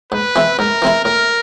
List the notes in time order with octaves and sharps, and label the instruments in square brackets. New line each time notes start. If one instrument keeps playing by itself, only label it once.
[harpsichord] G#2 [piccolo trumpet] B4
[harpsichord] E3 G#3 C4 E4
[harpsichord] G#2 [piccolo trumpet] A#4
[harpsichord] E3 G#3 C4 E4
[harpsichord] A2 [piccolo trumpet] A#4